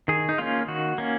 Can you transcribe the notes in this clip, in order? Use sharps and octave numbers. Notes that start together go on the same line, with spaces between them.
D#3 G#4
D#4
A#3 C#4 F4
D#3 F#4
A#3 C#4